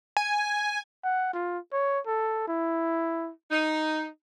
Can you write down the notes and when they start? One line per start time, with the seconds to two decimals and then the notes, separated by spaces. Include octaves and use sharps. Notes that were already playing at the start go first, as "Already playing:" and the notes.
0.17 G#5
1.04 F#5
1.34 F4
1.73 C#5
2.07 A4
2.48 E4
3.51 D#4